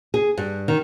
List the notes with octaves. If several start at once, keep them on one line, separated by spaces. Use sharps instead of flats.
G#4
G2
D#3